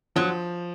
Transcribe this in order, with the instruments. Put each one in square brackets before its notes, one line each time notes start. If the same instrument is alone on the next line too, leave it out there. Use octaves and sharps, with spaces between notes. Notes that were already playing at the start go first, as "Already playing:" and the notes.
[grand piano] F3 [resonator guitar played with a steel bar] F#3